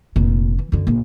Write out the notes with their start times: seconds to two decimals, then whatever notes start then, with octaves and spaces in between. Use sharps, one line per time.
0.16 F1 A#2
0.59 E3
0.72 F#2 D3
0.87 A#1 D4